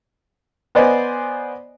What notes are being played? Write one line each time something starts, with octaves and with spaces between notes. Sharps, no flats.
B3 B4 C5 D5 D#5 G#5